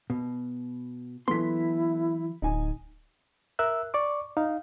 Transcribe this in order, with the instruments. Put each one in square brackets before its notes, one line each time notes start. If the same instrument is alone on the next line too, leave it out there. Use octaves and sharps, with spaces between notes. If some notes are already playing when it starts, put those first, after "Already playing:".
[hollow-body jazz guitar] B2
[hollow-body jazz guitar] E3 F#3 C6 [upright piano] B3 A4 B6 [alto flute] E4
[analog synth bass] D1 [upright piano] D#4 G#5
[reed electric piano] A#4 E5 E6 F#6
D5 C#6 D6
D#4 F5